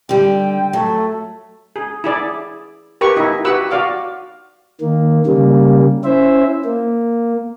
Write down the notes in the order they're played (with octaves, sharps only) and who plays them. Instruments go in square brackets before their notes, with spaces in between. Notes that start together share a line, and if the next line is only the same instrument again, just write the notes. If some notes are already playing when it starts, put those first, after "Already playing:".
[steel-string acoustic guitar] D3 G3 [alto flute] G5
[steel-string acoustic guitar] F#3 [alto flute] A3
[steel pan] G#4
E4 G#4 D5
G4 A#4 B4 C#6
D#4 E4
F#4 G4 B4 F#5 E6
F#4 D5 F5 D6
[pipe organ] D#3 A#3
C#3 G3 A#3
C#4 E4 C5 E5
A#3